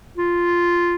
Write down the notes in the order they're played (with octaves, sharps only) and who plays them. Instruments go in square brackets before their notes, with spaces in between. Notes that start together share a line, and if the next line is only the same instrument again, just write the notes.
[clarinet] F4